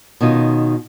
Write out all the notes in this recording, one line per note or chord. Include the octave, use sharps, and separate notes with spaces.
B2 D#3 C#4 D#4 F4